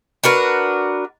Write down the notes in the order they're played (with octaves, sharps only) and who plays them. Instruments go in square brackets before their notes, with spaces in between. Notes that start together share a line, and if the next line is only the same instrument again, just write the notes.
[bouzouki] D4 F#4 A#4 B4